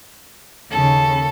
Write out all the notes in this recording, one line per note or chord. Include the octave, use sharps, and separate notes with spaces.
D#2 C#3 A4